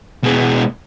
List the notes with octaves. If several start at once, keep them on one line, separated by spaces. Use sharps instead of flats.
B2 G#3